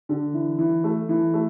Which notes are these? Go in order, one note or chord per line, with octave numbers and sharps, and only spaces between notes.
D3
E3
E3
A3
E3
A3